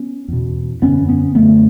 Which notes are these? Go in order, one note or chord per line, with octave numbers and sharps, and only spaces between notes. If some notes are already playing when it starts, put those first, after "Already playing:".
Already playing: B3 C#4
E2 B2
F#2 D3 B3 C#4
B3 C#4
F#2 D3 A3 B3